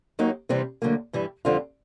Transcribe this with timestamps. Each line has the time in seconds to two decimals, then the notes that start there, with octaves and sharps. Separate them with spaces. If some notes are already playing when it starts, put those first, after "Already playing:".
0.19 D#2 D#3 F#3 A#3 D#4
0.49 C3 E3 G3 C4
0.82 D2 D3 F#3 A#3
1.13 G2 E3 G3
1.45 F2 D3 G3 C4 F4